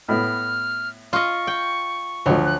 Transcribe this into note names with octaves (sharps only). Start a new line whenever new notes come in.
A2 B3 F6
F4 D#5 C#6
G5
D2 F3 F#3
F#6